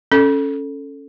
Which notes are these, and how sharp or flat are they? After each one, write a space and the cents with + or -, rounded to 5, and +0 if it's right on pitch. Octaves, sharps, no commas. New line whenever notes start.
C#4 -5 A4 +0